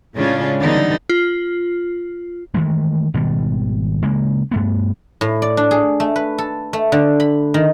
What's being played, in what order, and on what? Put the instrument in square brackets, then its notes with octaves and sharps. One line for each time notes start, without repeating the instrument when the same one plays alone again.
[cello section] A2 C#3 G#3 C#4 D4 F4
D3 E3 G3 B3 D#4
[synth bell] F4
[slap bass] D#3 E3 G#3 A3
G#1 B2 D#3 G3
C#3 G#3 A#3
G2 A3 B3
[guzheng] A2
D5
D4
G#4
A3
B4
A4
A3
D3
B5
D#3